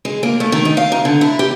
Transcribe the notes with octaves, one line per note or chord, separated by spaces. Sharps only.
G#3
A#3
A3
D#3
D#4
F5
D#4
D3
E4
G4